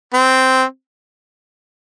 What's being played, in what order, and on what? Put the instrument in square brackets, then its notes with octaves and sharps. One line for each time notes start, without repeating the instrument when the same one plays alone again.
[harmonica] C4